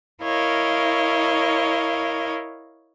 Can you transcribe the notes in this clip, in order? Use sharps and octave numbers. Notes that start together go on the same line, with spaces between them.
E4 A#4 C#5 D#5 F5